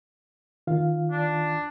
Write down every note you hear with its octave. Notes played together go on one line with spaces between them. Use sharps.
D#3 F4 F5
D4